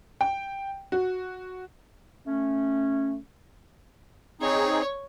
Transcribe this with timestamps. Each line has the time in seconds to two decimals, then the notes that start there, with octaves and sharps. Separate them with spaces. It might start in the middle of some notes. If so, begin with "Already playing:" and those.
0.21 G5
0.92 F#4
2.27 A3 C#4
4.41 C4 D#4 G#4 C#5